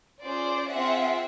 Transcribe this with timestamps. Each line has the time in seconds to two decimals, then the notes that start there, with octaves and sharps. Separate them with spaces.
0.22 C#4 F4 G#4 C5 D5
0.70 C4 F4 G#4 E5 F#5